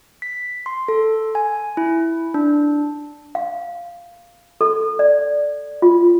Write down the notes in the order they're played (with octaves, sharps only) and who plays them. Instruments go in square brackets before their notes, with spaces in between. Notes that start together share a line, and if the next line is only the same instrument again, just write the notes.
[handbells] B6
C6
A4
G#5
E4
D4
[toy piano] F5
A4
D5
F4